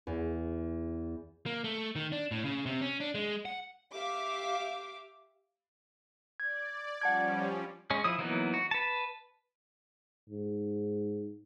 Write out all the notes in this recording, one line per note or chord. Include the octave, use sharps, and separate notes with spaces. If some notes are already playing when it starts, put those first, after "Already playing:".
E2
A#3
A3
D#3
D4
A2
C#3
C3
C#4
D4
G#3
F#5
G4 E5 F5 D6
D5 G#6
F3 G3 C#4 F#5 A5 G#6
G#3 C#4
F3 E4 D#6
E3 F#3 A#3 B3 D#4
F#4
B4 A5
G#2